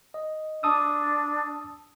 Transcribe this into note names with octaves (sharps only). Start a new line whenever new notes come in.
D#5
D4 A5 D#6 E6